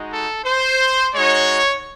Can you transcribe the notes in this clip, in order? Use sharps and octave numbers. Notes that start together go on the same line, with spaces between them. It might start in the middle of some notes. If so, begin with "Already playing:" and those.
Already playing: G#3 D#4 F#4
A4
C5
G#3 D#4 F#4 C#5